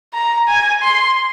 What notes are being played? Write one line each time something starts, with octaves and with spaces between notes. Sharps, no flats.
A#5
G#5
C6